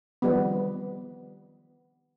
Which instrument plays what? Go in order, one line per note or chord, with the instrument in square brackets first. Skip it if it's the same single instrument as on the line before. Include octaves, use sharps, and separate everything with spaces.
[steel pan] D#3 F3 G3 B3